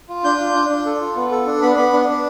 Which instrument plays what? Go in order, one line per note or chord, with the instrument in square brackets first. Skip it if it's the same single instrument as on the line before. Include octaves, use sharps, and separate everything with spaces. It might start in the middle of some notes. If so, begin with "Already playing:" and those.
[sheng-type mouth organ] F4
D4 G6
F4
D4
D4
A4
F4
B3
A4
D4
B3 B5
B3 B5
D4
D4